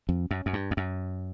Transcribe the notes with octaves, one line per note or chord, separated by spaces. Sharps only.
F2
F#2
F#2
G2
F2
F#2